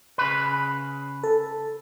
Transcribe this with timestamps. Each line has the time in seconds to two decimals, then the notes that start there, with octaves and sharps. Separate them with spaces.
0.18 C#3 B4
1.24 A4